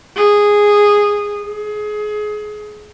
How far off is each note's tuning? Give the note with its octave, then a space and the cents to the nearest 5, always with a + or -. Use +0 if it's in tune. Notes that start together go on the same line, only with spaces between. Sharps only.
G#4 -10
G#4 +25